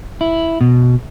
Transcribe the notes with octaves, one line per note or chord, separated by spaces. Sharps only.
E4
B2